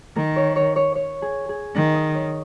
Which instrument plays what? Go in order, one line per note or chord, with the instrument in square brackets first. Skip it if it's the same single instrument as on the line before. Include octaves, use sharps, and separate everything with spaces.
[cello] D#3 [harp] A#4
[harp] C#5
C#5
C#5
C#5
G#4
G#4
[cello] D#3
[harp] D#5
C#5